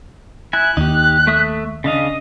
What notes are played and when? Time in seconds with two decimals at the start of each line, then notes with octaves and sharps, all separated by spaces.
0.53 E4 G#5 F#6
0.77 D#2 D#4 G4
1.27 A3 E5 D#6
1.84 C#3 D4 D#5 F5